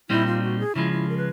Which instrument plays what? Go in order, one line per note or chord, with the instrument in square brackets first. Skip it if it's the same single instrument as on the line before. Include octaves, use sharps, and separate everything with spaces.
[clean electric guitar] A#2 G3 C4 D#4 [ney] E4
[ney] F4
F#4
G#4
[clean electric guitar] C#3 F3 G#3 [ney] E4
[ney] E4
A#4
B4